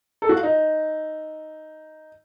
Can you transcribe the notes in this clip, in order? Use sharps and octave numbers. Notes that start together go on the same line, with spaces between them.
A4
F#4
F4
D#4